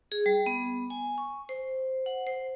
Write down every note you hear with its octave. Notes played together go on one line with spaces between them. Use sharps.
G#4
G3
B3
G#5
C#6
C5
F#5
C5